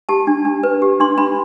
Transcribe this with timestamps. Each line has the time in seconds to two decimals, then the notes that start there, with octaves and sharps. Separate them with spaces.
0.09 G4 A5
0.27 D4
0.45 D4
0.63 B4
0.82 G4
1.00 D4 C6
1.18 D4 B5